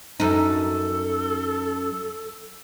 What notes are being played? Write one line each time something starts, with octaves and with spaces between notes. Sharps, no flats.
F#2 D#4 A4